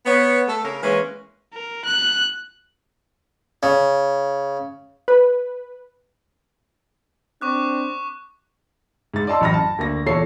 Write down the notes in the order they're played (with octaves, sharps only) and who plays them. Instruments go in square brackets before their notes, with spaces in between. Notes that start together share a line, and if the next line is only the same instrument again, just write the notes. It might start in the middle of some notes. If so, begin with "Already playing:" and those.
[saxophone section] B3 C#5
A3 A4
C#3 A#4
E3 G#3 A#3 C#4 A#4 B4
[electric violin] A#4
F#6
[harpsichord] C#3
[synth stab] B4
[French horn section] C4 D4 [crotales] C#6 D6 F#6
[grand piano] G#2 A6
D5 D#5 A5 C6 E6
A1 F#2 B5 F6 A#6
A5
D2 A#3 A#6
E2 A#2 A4 C#5 C7